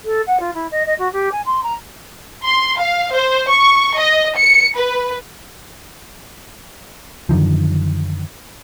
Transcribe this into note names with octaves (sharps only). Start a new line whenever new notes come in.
A4
F#5
F4
E4
D#5
D#5
F#4
G4
G#5
C6
A#5
C6
F5
C5
C#6
D#5
C#7
B4
F#2 D3 D#3 F3